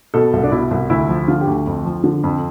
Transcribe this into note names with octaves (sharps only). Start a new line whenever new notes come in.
B2 A4
C2
D4
B2 E4
C2
D2 E4
F3
D3 F4
G4
D2
F2
F3
D3
F2